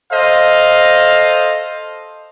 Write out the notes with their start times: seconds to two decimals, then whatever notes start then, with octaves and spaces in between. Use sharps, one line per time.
0.11 A4 C5 D#5 F5